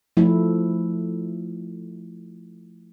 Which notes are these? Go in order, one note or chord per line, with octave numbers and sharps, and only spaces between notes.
F3 A3 E4